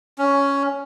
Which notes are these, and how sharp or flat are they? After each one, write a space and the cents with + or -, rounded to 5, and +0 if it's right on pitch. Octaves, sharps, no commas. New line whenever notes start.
C#4 +5